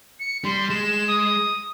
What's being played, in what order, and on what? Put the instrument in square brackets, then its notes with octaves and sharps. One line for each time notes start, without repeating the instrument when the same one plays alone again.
[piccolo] C#7
[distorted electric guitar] G3 [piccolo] C6
[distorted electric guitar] G#3 [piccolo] E7
[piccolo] D#6